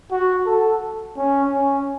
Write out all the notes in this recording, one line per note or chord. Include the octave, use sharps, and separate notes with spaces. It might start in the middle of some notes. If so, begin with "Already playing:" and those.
F#4
A4
C#4
C#4